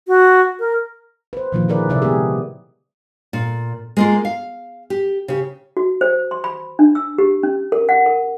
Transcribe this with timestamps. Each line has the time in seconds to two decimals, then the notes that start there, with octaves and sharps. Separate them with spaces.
0.08 F#4
0.60 A#4
1.33 B4 C5
1.52 A#2 D3 D#3 F3 A#3 F4
1.68 E4 G#4 A#4 B4 D5
1.89 C3 A#4 D5 E5
2.02 G#3 B3 G4 G#4
3.33 A#2
3.97 G#3 A#3 F4
4.25 F5
4.90 G4
5.28 C#3 G4
5.77 F#4
6.01 C5
6.31 C6
6.44 B5
6.79 D4
6.95 E6
7.18 G4
7.43 C#4
7.72 A#4
7.89 F#5
8.06 A#4